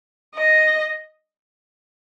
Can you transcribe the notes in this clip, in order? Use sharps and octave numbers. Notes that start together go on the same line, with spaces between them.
D#5